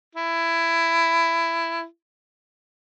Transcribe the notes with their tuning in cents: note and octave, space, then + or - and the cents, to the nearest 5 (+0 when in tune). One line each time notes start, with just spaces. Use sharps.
E4 +15